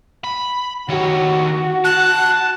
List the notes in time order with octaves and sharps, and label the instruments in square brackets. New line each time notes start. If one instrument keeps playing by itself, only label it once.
[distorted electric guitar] B5
[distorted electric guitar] D#3 C#5 [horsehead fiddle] F#4
[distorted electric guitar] A5 [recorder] F#6